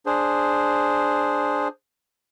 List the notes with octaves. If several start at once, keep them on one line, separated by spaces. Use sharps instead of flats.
D4 G#4 C5